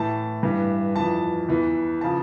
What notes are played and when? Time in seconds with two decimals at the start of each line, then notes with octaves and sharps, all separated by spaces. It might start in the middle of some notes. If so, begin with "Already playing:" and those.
Already playing: A2 E3 A5
0.43 G2 E3
0.95 F2 E3 A5
1.48 E2 E3
2.01 C#3 F3 A5